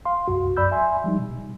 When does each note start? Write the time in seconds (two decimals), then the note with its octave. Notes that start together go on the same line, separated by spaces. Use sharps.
0.05 F5 C6
0.28 C2 F#2 F#4
0.57 F#2 D5 B5 E6 G6
0.71 E5 G#5 C6
1.04 F3 G3 D#4
1.19 B2